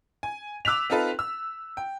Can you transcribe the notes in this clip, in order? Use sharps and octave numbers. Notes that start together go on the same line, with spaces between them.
G#5
D6 E6 F#6 B6 F7
C4 D#4 F4 A4 B4
E6
G5